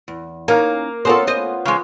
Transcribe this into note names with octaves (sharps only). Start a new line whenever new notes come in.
E2
A#3 C#4 D#4 A#4 F5
B3 C#4 F4 A4 A#4 C5
C5 D#5
C#3 G#3